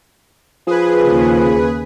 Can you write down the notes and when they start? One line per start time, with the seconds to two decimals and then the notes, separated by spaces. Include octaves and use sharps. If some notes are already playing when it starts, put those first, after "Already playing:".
0.67 F3 G#4 B4
1.03 D#2 C#3